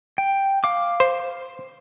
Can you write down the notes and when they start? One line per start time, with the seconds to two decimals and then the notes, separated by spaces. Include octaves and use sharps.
0.18 G5
0.64 F5 D6
1.00 C5